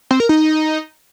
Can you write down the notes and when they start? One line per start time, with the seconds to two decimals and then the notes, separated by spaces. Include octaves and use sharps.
0.11 C4
0.20 A#4
0.29 D#4